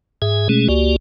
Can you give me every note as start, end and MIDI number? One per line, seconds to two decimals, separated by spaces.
0.22 0.48 44
0.22 0.48 68
0.22 0.48 76
0.22 0.48 80
0.49 0.68 47
0.49 0.68 56
0.49 0.68 57
0.49 0.68 61
0.49 0.68 68
0.68 0.96 37
0.68 0.96 58
0.68 0.96 66
0.68 0.96 67
0.68 0.96 74